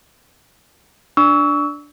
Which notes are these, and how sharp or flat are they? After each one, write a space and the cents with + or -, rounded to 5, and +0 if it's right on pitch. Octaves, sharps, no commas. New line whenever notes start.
D4 +0 C#6 +30 E6 -15